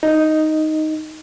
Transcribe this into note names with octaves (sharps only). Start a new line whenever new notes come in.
D#4